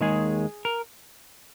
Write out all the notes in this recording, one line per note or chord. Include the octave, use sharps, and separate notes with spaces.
D#2 D#3 G#3 G#4
A#4